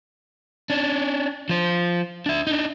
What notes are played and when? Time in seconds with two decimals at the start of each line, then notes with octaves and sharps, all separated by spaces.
0.70 C#4 D4
1.49 F3 C5
2.26 D4 E5
2.47 D4 D#4